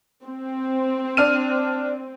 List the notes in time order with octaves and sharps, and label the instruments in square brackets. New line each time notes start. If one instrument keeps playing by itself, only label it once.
[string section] C4
[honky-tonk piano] D4 F6 D#7